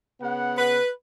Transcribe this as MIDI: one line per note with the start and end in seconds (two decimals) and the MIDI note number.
0.21 0.79 49
0.21 0.79 59
0.21 0.79 78
0.58 0.89 71